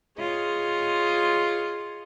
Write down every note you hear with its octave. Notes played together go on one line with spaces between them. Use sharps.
F4 G#4 C#5 D#5